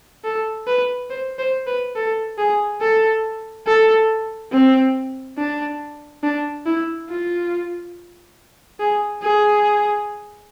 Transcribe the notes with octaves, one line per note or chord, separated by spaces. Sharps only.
A4
B4
C5
C5
B4
A4
G#4
A4
A4
C4
D4
D4
E4
F4
G#4
G#4